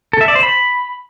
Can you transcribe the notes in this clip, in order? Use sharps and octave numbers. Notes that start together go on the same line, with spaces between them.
A4
E5
D5
C5
B5